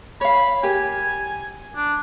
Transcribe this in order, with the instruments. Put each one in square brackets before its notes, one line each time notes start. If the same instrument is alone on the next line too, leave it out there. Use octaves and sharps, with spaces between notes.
[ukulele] C#5 F5 [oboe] B5
[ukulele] G4 A#4 [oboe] G#5
[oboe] D4